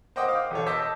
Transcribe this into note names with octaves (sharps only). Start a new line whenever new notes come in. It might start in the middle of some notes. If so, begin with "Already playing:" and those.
C5 D#5 F#5 G5 D6 D#6
F5 D6
E1 A4 C#5
D#5 A5 D6 E6 G6 B6